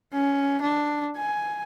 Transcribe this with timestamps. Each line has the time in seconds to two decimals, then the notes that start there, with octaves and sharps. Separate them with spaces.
0.13 C#4
0.62 D4
1.17 G#5